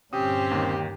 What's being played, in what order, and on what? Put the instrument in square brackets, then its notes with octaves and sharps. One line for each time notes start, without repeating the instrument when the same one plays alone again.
[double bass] G1 A#2 [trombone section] C4 C#4 [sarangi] G4 [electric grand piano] D#6
[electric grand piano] D#2 D#3